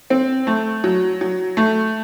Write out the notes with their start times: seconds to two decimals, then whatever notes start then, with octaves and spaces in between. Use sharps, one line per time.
0.10 C4
0.47 A3
0.84 F#3
1.21 F#3
1.57 A3